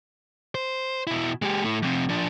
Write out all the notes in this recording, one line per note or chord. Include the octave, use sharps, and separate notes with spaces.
C5
B2 E4
G#3 G4
A3 E4
F2 C3
F3 D4